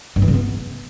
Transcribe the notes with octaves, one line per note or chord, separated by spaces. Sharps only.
G2
E3
C#3
B3